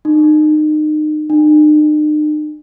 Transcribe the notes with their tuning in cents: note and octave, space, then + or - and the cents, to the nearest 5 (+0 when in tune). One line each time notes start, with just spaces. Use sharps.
D#4 -30
D#4 -45